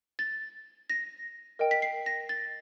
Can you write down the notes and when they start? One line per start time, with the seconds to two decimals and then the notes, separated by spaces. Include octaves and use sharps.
0.19 A6
0.90 A#6
1.59 A#4 D#5 G5
1.71 B6
1.82 C7
2.06 A#6
2.29 A6